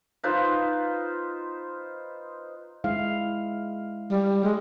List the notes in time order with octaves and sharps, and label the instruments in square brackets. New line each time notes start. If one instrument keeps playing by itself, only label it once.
[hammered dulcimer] D#4 F4 B4 C5
[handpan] G#3 E4 F5
[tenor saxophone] G3
G#3